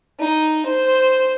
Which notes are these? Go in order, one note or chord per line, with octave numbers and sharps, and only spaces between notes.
D#4
C5